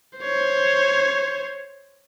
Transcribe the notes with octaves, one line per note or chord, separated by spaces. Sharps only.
C5 C#5